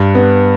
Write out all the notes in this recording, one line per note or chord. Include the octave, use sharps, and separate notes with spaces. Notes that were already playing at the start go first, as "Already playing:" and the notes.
Already playing: G2
B3